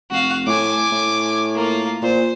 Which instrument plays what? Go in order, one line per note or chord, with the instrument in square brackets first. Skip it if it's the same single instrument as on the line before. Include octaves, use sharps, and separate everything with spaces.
[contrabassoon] F1 [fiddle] F#4 F5
[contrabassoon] A2 [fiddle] G#5 D6
[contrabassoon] A2
[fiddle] A#3 F4
[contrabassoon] A#2 [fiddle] C5